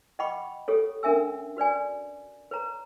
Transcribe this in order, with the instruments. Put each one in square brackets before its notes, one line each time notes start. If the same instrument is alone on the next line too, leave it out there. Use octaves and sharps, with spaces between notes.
[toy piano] D#5 F#5 G5 B5 C#6 D6
G4 A4 C#5
C#4 D4 A#4 E5 G#5 E6
F#4 B4 D5 G#5
B4 C#5 A#5